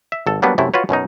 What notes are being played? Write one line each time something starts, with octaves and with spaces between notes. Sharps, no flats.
E5
G#1 A4
F#3 G3 A#3 B3 D4
F#2 C3 A3 E4
F4 F#4 B4 C#5
F#2 B2 C#4 D#4